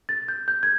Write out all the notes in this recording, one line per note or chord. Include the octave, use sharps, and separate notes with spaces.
A6
G6
G6
G#6